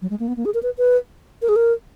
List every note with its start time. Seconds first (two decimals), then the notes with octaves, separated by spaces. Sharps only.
0.02 F#3
0.10 G#3
0.20 A#3
0.28 B3
0.37 A#3
0.45 G#4
0.54 A#4
0.63 B4
0.78 B4
1.42 A#4
1.49 G#4
1.56 A#4